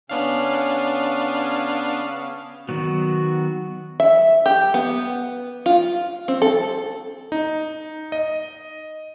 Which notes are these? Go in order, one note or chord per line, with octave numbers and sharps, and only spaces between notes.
C#3 B3 C#4 D4 F5
D#3 F#3 B3 F#4
E5
G4
B3
F4
C4
A4
D#4
D#5